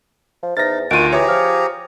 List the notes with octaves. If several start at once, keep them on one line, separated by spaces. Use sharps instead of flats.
F3
E2 D#4 C5 E5 F6 A6 A#6
D2 D#3 F4 F#4 F#5 D7 D#7
E3 G4 G#4 B4 C#5 A#5
F3 F6